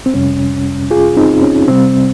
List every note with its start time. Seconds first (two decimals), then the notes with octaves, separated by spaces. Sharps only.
0.06 C4
0.14 F2 C3 G3 C#4
0.91 F4 G#4
1.17 C4 D#4
1.42 C#4
1.68 C3 G3 C4